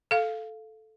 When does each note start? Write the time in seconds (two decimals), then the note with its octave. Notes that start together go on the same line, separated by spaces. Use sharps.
0.11 A4 F5